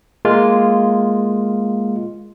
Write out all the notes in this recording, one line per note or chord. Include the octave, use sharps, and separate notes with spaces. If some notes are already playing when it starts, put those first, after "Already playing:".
G#3 A#3 F4